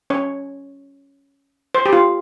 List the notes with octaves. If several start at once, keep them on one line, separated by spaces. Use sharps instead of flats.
C#4 C#5
C5
G4
F4